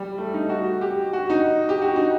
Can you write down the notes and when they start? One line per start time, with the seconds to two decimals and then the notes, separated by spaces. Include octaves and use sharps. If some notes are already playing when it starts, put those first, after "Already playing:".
Already playing: G3
0.18 A3
0.34 D#4
0.49 F#4
0.81 G4
1.13 F#4
1.30 D#4
1.69 G4
1.82 F#4
1.96 D#4